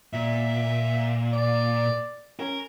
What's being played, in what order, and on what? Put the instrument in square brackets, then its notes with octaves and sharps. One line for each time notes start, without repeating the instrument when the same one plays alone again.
[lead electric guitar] A#2 [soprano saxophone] E5
[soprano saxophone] D5
[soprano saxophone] C#4 [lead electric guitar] A#4